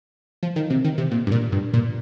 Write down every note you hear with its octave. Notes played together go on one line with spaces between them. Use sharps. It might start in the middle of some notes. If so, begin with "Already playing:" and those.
F3
D#3
C3
D#3
C3
A#2
G2
A#2
G2
A#2